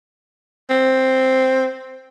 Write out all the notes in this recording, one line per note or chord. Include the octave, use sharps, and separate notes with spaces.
C4